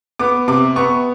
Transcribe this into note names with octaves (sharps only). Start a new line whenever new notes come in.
B3 D6
C3 D6
B3 C#6